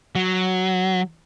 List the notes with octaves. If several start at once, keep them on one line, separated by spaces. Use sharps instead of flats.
F#3